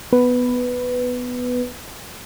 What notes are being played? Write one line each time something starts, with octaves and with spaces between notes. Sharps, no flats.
B3 B4